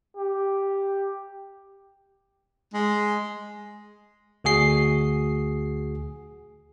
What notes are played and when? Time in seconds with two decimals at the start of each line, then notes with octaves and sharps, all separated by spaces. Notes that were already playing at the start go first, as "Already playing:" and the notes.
0.17 G4
2.74 G#3
4.44 D2 F#4 G#4 C7